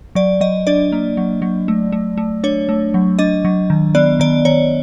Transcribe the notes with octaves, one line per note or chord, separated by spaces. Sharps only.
F#3 D5
F#3 D#5
D4 D5
A#3
F#3
F#3
A3
A3
A3
D4 C#5
A3
F#3
D4 D#5
F#3
D#3
B3 D5
D#3 D5
D#3 C#5